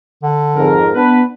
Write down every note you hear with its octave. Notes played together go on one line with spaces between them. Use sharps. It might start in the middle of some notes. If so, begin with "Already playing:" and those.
D3
F2 G#2 A#4
B3 D4 B4